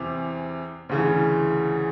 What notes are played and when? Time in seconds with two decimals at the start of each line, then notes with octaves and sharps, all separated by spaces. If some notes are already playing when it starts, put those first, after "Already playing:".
Already playing: E2 C3 E3
0.89 D2 C#3 E3